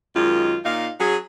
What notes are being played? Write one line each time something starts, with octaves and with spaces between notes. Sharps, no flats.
F#2 D#3 G#3 F4
A#2 D#4 F5
F#3 C#4 G#4